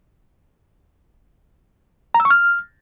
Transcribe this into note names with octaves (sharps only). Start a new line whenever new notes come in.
A#5
E6
C#6
F6